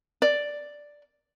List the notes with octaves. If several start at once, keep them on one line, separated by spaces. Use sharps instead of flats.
D5